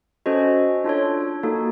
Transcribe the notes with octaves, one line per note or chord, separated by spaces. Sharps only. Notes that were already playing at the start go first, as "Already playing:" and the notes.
C#4 F#4 A4 C5 D#5
D4 F4 A4 C#5
A#3 D#4 F#4 A4